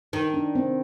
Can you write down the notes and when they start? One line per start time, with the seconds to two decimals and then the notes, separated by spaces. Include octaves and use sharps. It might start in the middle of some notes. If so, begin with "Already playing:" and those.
0.13 D#3
0.34 D4
0.55 C4